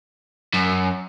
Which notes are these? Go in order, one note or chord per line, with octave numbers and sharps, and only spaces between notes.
F#2